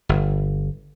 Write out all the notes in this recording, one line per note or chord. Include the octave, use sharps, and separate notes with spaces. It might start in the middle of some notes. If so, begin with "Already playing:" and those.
G1